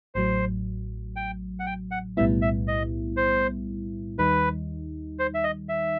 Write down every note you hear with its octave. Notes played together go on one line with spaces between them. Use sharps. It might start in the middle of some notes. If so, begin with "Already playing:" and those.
A1 A2 F#3 C5
G5
F#5
G5
F#5
B1 A2 G3 B3 E4 E5
E5
D#5
C5
D#2 D#3 G3 D#4 B4
C5
E5
D#5
E5